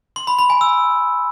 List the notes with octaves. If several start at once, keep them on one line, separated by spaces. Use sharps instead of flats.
C6
B5
B5
G#5
E6